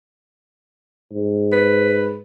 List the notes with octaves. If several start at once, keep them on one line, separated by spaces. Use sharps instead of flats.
G#2
B4